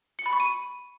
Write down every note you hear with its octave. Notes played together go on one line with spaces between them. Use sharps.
C#7
B5
C#6
D#7